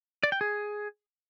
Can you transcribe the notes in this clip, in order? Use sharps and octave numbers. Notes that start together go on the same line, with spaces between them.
D5
G5
G#4